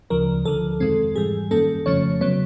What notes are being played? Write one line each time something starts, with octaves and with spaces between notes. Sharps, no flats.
D2 C#3 F3 A#4
D2 D3 F3 A4
F2 C3 D#3 G#3 C4
G#2 E3 G3 G#4
F#2 D#3 G3 A#3 C#4 A4
F2 C#3 F3 A3 C#4 C#5
C#3 F#3 B3 C#5